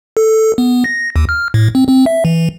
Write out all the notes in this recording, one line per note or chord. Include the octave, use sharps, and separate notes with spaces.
A4
B3
A#6
D#2
F6
A2
C4
C4
E5
E3